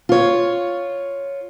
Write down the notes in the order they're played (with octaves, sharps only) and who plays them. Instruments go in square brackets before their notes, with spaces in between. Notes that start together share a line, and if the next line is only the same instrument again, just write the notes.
[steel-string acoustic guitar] F4 C#5